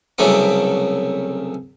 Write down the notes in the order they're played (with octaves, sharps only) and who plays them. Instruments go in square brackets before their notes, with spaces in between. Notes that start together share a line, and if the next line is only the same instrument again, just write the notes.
[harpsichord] C2 C#3 F#3 A3 B3 D6